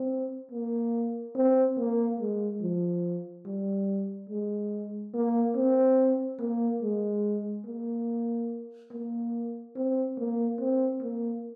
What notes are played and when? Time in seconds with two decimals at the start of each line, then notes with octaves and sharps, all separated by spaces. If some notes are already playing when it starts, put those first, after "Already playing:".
Already playing: C4
0.51 A#3
1.36 C4
1.78 A#3
2.20 G#3
2.62 F3
3.46 G3
4.29 G#3
5.14 A#3
5.56 C4
6.39 A#3
6.82 G#3
7.66 A#3
8.91 A#3
9.76 C4
10.18 A#3
10.60 C4
11.02 A#3